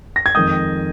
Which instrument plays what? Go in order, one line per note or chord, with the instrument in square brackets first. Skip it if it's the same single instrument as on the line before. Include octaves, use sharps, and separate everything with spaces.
[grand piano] A#6
G#6
F2 D#3 G#3 D#6 G6